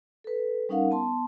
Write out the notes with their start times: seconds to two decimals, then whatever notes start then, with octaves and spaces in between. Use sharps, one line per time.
0.24 A4 B4
0.69 G3 C#4 D#4 A#4 F5 F#5
0.91 B3 A5 C6